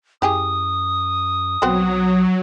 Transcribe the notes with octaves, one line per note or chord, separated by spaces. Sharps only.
F#2 E4 G4 G#4 D#6
B1 F#3 B3 C4 F#4